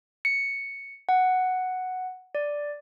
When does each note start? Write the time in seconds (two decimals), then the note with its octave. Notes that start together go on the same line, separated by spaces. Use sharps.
0.25 C#7
1.09 F#5
2.35 D5